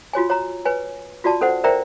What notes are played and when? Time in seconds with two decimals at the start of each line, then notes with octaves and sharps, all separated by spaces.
0.13 F4 F#4 C#5 G#5
0.30 C#5 A#5
0.65 B4 C#5 G#5
1.24 F4 F#4 D5 A5
1.41 C#4 A4 C5 F#5
1.64 A#4 C5 D5 E5 G5 A#5